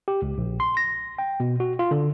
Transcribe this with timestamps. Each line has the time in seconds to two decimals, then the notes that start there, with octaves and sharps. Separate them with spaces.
0.08 G4
0.22 C#2
0.38 A#1
0.60 C6
0.77 A#6
1.19 G5
1.40 B2
1.60 F#4
1.79 F4
1.91 D3